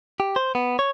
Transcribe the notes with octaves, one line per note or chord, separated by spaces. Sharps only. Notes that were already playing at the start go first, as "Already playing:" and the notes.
G4
C5
B3
C#5